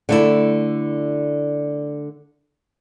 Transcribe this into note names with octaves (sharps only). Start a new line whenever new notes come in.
D3 A3 E4